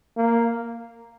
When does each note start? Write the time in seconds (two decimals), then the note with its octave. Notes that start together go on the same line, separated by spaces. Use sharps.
0.17 A#3